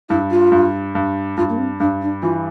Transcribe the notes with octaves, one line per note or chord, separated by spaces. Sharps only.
G2 E4
F4
G2
G2
G2 F4
A#3
C4
G2 D4
D4
E3 F4